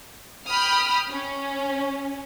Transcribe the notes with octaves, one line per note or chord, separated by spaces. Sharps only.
G5 B5 D#6 F6
C#4